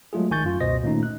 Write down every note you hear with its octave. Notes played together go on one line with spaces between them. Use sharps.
F#3 G#3 A3 F4 G#4
G#1 D#3 G#5 C#6 G6 A6
F#2 F4
C#2 B2 C5 D#5 A#6
A#2 D#3 A3 C#4 D#4
F#6